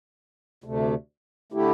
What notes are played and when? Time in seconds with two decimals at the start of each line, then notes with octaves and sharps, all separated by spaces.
0.64 D2 C3 A3
1.52 D3 A3 E4 G4